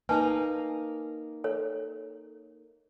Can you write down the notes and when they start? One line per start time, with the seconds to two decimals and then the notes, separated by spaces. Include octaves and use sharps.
0.09 A#3 D#4 B4 G#5 A5
1.44 A4 C#5